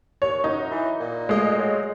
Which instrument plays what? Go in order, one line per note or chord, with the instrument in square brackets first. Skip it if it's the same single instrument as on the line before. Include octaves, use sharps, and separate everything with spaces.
[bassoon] D#2 [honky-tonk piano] C#5
[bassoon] F#2 [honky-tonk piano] D#4
[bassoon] E3
A#2
[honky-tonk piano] G#3 A3 D#5
[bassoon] F#3